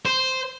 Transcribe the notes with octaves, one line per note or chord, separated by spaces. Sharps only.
C5